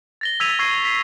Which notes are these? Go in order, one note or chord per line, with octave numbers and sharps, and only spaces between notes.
A6 A#6 G7
E6 G#6 B6 D#7 F7
C#6 E6 G#6 C7 D#7
B6 C7 F7